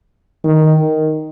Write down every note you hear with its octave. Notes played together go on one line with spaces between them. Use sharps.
D#3